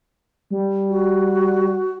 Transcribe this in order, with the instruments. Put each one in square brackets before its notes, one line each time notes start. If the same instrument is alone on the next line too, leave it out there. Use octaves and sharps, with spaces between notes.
[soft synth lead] G3
[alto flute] F#4